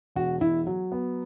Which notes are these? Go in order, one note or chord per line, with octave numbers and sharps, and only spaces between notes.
E1 F#4
E1 E4
F#3
B3